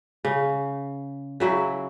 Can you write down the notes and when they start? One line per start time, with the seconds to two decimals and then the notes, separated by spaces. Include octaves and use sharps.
0.25 C#3
1.40 C#3 F#3 E4